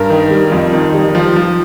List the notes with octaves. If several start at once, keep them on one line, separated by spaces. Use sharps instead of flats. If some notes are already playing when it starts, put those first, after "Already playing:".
Already playing: G2 A#4
D#3
G3
F2
D#3
G3
F3
F3